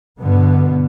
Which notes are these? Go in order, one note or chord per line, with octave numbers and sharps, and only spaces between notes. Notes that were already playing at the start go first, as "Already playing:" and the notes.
G2 B2 D3 B3